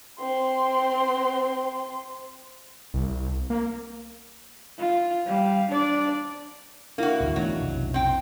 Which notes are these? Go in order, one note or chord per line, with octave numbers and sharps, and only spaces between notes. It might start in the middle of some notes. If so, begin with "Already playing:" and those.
C4 C6
C2
A#3
F4
G3 F5
D4 D5
A#3 D4 E4 F#4
A1 D2 G2
D#3 E3 F#3 A3 B3 D4 D#4
B1 F2 C3
C4 G5